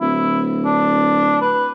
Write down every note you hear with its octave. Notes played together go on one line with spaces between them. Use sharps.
D1 E4
D4
B4